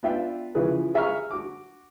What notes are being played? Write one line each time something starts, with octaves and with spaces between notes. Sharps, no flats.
B3 D4 F4 D5 E5 G5
C#3 E3 F3 G#4 B4
G#4 E5 F5 A#5 C#6 F6
F#4 D6